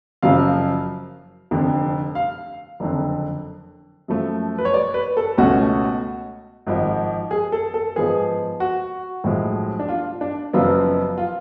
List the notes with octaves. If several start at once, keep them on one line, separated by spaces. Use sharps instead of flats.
F#1 F#2 C#3 F3 F5
F1 F2 D3
F5
F#1 F2 D3
F#2 F3 A3
B4
C#5
D5
B4
A4
C#2 B2 A3 C#4 F#4
G#1 G#2 F3
G#4
A4
A4
G#2 F3 B3 G#4
F#4
B1 A2 F3 G#3
D4
F4
D4
F#1 F#2 F3 B3 F4
F4